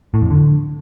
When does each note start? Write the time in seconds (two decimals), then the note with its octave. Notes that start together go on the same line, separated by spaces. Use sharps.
0.14 A2
0.22 F2
0.31 D3